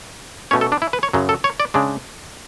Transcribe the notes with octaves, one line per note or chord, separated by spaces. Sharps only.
B2 A3 C#4 C#5
A4
D4
E4
B4
C#5
F#2 C#3 F#3
A4
C#5
D5
C#3 G#3 D4